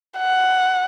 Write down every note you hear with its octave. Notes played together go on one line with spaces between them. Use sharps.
F#5